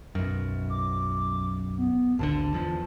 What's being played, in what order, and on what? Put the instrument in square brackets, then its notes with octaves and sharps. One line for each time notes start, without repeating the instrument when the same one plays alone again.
[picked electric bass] B1 F#2
[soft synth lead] D6
B3
[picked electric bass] G#1 D2 D3 [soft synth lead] A5
[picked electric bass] E2 F3